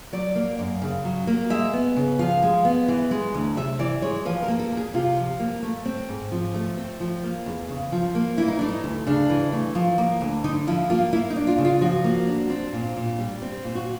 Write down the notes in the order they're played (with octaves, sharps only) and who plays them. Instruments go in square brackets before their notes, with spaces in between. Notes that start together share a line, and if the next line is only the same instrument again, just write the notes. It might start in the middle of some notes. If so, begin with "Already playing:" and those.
[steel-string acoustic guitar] F#3 D5
A#3
F#2
C#3
F#3
A#3
G#3 E5
B3
C#3
F3 F5
G#3
B3
E3
G#3
D2
C3 E5
E3 D5
G#3 C#5
F3 B4
A#4
A#3
A4
E2
G#4
C3 F4
F3
A#3
A3
C4
G#2
F3
A3
C4
F3
A#3
E2
C#3
F3
A#3
E3 E4
D#4
A3 D4
D#4
D2
C#3 D4
E3
A3
F3
A#3
D2
D3 D#4
F3 E4
A#3 F4
A#3 E4
D#4
D4
F4
C#3
F4
F3 F#4
A#3
D4
C4
A#2
A#2
G3
C4
A#2
F#4